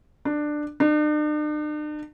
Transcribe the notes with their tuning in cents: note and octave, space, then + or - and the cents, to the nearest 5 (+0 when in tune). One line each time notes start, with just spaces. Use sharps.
D4 +15
D4 +45